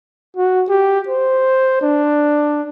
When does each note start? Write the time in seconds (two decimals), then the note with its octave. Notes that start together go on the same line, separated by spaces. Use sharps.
0.37 F#4
0.69 G4
1.08 C5
1.82 D4